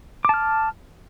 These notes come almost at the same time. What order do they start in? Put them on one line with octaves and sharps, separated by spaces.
D6 A5 F6